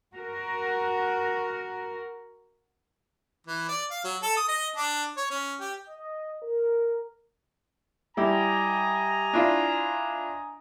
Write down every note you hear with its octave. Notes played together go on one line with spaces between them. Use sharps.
F#4 A#4
E3
D5
F5
F#3
A4
D#6
D#5
D4
C#5
C#4
G4
D#5
A#4
G3 E4 G4 D#5 G#5 A#5
D4 E4 F4